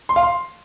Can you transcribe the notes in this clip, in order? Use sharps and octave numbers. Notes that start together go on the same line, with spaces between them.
C6
F5
C6